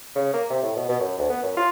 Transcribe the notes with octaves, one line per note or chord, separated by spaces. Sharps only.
C#3
A#3
C3
A2
B2
B2
F#2
D2
B3
F#2
F4